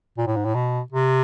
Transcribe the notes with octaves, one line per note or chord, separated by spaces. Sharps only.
A#2
A2
G#2
A2
B2
C3